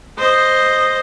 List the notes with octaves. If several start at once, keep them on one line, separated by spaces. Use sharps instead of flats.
C5 D#5